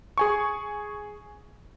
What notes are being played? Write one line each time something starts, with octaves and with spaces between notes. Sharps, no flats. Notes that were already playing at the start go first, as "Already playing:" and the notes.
G#4 G#5 C#6